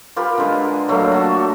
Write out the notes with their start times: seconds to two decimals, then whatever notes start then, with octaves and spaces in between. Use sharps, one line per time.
0.16 F4 G4 A#4 B4
0.38 D3 G#3
0.88 F#3 A3 A#3 F5
1.12 F#4 A5